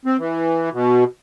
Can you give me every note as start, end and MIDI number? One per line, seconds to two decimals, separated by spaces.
0.06 0.17 60
0.19 0.69 52
0.73 1.04 47